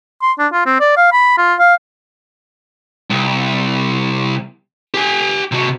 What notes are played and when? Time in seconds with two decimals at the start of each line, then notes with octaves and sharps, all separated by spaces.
0.22 C6
0.39 D4
0.53 F4
0.66 C4
0.80 D5
0.97 F5
1.12 B5
1.38 F4
1.59 F5
3.10 C2
4.94 G4 G#5
5.52 C3 F#4